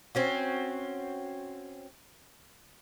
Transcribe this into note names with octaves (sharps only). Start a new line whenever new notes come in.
C4 C#4 F#4